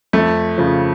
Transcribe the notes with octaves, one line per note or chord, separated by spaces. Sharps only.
F2 A3
C#3 F3